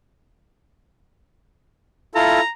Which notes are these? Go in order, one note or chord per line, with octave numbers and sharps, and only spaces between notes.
E4 F4 A4 A#5